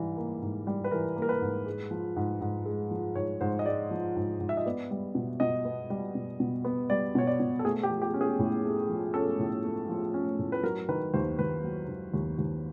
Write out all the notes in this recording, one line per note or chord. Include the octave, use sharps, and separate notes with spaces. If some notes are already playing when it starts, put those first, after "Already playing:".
Already playing: G#2 E3 G3
A#3
G#2
G3
B4
E3 A#4
A#3
A#4
B4
G#2
G#3
F3
G#2
G#2
G#3
F3
G#2 C#5
G#2 C5
D#5
G#3 D5
F3
G#2
G#2
E5
D#5
B3 D5
G3
B2
B2 D#5
B3
G3
B2
B2
B3
G3 D5
B2 C#5
D5
B2
A4
A3 G#4
G4
F3
G4
C#4
G#4
A2
A3
F3
C#4 A4
A2
A3
F3
C#4
A2
B4
F#3 A#4
D#3 B4
D#2 C5
D#2 B4
F#3
D#3
D#2
D#2